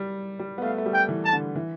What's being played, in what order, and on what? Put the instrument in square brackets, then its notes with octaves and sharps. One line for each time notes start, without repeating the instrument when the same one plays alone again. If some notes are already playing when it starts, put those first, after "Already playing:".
Already playing: [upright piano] G3
G3
B3
[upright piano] A3 [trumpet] F5
[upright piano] A3
G3
[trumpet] G5
[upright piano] E3
[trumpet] A5
[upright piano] D3
E3